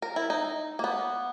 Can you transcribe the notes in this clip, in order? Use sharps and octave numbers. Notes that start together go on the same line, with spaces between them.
A#4
E4
D#4
A#3
B3